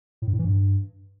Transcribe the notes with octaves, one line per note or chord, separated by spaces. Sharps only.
A2
G2
A2
E3
G2